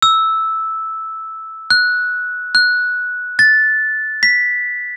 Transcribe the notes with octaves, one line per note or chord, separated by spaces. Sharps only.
E6
F#6
F#6
A6
B6